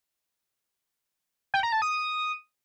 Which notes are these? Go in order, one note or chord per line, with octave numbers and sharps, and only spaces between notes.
G5
A#5
A5
D#6